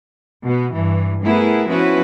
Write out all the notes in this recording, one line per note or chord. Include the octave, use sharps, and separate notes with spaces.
B2 B3
G2 E3
A3 B3 E4 G#4 A#4
F3 B3 C#4 E4 F#4 B4